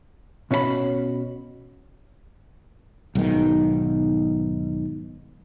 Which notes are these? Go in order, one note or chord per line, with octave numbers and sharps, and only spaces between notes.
B2 C#4 F#4 D5 B5
B1 G#2 D#3